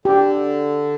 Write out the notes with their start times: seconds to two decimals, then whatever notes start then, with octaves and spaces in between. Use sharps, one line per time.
0.05 D3 G4